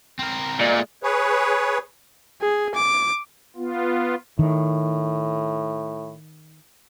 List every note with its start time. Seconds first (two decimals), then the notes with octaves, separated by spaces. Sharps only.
0.19 C4 A#4
0.60 A#2 G#3 A3 D5
1.03 G#4 B4 C#5
2.41 G#4
2.75 D6
3.56 B3 F4
4.39 A2 D#3